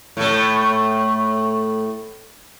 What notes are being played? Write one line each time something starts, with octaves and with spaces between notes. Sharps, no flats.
A2 A3